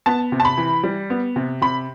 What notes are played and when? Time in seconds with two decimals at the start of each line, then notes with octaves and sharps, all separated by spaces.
0.06 B3 A5
0.32 C3
0.40 A5
0.45 B5
0.57 E3
0.83 G3
1.10 B3
1.36 C3
1.62 C3 B5